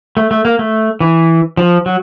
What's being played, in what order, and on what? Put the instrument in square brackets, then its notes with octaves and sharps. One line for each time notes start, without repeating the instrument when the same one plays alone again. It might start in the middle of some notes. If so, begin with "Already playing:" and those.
[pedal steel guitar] A3
A3
A#3
A3
E3
F3
F#3